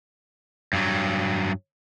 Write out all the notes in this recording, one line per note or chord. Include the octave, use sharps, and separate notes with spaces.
G2 F#3